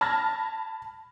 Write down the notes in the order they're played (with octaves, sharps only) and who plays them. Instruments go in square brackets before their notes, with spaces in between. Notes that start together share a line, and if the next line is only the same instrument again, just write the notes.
[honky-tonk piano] A5 B5 F6 G#6 A#6